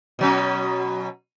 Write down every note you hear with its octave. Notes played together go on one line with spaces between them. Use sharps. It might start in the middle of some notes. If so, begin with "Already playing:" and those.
B2 F#3 C#4